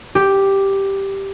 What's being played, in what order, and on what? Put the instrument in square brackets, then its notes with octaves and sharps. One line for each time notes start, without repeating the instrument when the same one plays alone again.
[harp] G4